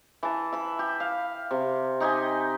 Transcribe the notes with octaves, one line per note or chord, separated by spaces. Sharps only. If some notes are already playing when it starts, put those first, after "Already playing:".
E3 A5
E5 B5
G4
F5
C3
D#4 G4 D#5 G#5